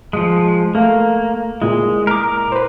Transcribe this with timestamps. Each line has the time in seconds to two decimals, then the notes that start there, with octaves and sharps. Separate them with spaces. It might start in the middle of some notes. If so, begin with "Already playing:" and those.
0.13 F3 G#3
0.75 A3 A#3 F5
1.62 A#2 G#3 E4
2.07 A#4 D6
2.52 B4 C5